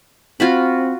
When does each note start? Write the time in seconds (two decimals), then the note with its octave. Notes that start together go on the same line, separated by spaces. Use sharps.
0.40 C4 F4 F#4 B5